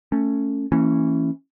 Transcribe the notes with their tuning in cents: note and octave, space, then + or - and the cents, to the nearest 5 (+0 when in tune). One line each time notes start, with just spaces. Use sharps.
A3 +15 C#4 +0
E3 +0 A#3 -40 C#4 -10